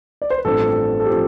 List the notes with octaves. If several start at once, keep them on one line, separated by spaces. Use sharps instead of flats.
D5
C5
B4
A1 G2 F3 C4 A4
A4
G4
F3 C4